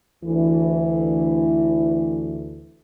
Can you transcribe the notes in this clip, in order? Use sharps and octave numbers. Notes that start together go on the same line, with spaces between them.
D2 E3